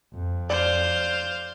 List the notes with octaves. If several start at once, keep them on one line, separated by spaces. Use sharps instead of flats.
F2
C5 D5 F5